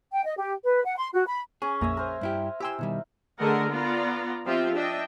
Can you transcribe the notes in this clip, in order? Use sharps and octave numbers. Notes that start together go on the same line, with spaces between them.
G5
D#5
G4
B4
F#5
C6
F#4
B5
C#4 G#4
A#1 F2 A#3 E5 G#5 A#5
A#4 C5
G2 E4 G4
E4 G4 E5 G5 G#5 C6 E6
B2 D#3 G3
D3 A3 G#4 A#4 D#5 F#5
B3 F4 D5 A#5
F3 C4 F4 G4 E5
D4 D#5 E5 G5